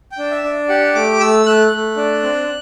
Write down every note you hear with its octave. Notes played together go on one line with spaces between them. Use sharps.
G5
D4
E5
D4
G4 F#5
A3 D6
A3 E6
A3 F#6
A3
D4
C4